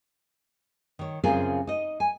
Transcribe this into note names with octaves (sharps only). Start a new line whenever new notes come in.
D#3 C#5
F#2 C#3 C4 F4 G#4 A#4
D#4 D#5
G#5